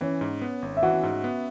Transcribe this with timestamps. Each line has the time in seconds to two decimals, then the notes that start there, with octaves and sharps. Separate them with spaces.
0.01 E3 C#4 C#5
0.21 G#2
0.42 B3
0.62 G#1
0.77 E5
0.83 E3 F#4 F#5
1.03 G#2
1.24 B3